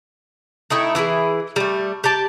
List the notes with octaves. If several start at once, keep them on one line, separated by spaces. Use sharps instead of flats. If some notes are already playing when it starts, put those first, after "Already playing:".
A3 D#4 E4 G5
E3 E4 G4 G#4
G3 A3
G4 D5 A5